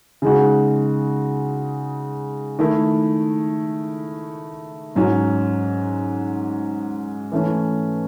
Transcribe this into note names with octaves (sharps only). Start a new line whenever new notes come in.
C#3 G#3 D#4 F#4
D#3 A3 E4
G#2 F#3 C#4
E3 A3 C#4